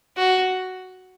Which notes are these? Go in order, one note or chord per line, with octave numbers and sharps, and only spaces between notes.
F#4